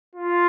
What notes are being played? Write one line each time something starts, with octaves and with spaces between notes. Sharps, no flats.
F4